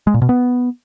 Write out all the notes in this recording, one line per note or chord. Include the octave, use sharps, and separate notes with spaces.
G#3
A#2
B2
B3